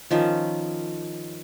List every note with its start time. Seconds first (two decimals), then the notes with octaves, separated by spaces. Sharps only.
0.11 D#3 F3 C#4 E5